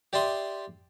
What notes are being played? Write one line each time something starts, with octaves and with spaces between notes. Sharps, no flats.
G4 D5 E5 C6 D#6